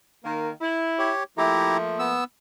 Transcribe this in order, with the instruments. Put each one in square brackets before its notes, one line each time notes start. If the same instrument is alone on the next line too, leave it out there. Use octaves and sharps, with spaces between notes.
[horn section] D#3 A#3
E4
[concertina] G4 C#5
[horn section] F3 A3 A#3 [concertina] E4 G4 A#5
[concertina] B3 E6